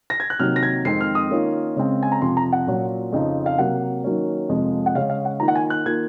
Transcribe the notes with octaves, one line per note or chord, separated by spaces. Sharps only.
A#6
G#6
F#6
C3 D#3 F#3 A#3 F6
A#6
G#6
F2 D#3 G#3 C4 C7
F6
D#6
D#3 A#3 C#4 F4
C#3 G#3 C4
G#5
A#5
F2 C3 F3 C6
A#5
F#5
A#2 F#3 C#4 F4
F2 C#3 F3 C4 D#4
F5
C3 F#3 A#3 F#5
D#3 F#3 A#3 C#4
F2 C3 F3 G#3
F#5
C#3 G#3 C#4 F5
F5
F#5
D#3 A#3 F4 A#5
F#5
G#5
F#6
D#3 A#3 F4 G#6